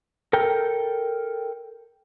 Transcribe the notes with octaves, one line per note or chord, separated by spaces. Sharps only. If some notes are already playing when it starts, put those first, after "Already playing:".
A4 A#4 G5